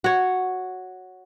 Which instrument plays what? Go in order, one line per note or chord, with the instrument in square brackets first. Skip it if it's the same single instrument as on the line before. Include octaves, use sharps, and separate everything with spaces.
[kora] F#4 C#5